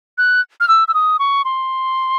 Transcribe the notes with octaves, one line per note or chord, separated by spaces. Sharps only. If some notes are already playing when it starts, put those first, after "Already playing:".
F#6
F6
E6
E6
D#6
C#6
C6